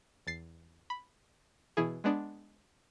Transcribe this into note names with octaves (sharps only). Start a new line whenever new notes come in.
E2 A6 C7
B5
B2 E3 E4 G#4
G#3 B3 D4